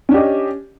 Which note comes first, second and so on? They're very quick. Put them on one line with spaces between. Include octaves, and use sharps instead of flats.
C#4 D4 G4 D#5